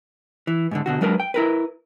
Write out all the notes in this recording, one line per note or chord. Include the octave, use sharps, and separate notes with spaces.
E3
G#2 B2 D3
B2 D3 F#4
F#3 G#3 D4 A#4 B4
G5
E4 A#4 B4